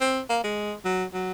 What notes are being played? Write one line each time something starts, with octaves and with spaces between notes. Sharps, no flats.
C4
A#3
G#3
F#3
F#3